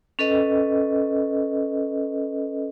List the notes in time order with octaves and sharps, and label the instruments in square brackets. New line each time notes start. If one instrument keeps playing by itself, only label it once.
[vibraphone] C#4 A4 B4 D#5